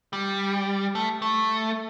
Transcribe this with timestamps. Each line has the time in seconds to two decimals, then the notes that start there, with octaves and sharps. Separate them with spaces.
0.13 G3
0.95 A3
1.22 A3